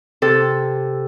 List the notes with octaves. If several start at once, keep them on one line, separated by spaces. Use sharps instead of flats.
C3 A4